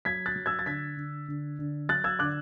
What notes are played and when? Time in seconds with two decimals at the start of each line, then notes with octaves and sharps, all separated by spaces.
0.05 F#3 G#6 B6
0.26 F#6 A6
0.36 F#3
0.46 E6 G#6
0.59 A6
0.66 D3 G#6 B6
0.97 D3
1.28 D3
1.59 D3
1.89 F#3 F#6 A6
2.04 E6 G#6
2.19 D3 D6 F#6